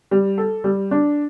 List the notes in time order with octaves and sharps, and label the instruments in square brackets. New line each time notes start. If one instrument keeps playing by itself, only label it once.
[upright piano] G3
A4
G3
D4